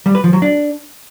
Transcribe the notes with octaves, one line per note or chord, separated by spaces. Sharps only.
G3
B4
F3
F#3
D4